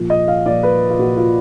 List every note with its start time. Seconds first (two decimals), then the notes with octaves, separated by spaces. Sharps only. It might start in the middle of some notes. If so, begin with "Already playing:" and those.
Already playing: A#2 F3
0.10 D#5
0.28 F5
0.46 A#2 F3 D5
0.63 B4
0.90 F4
0.99 A#2 F3 F#4
1.17 F4